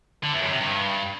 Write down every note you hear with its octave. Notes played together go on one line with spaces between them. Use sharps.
D3
E2
F#2
C3
G2